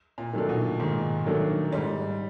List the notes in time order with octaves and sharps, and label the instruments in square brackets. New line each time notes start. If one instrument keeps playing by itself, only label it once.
[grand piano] A#2
[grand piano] A#2 [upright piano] D#3 F#3 A3 D4
[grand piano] B2
[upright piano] G#2 [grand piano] D#3
[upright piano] D#3 F#3 A3 D4
[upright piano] G#2 [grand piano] G3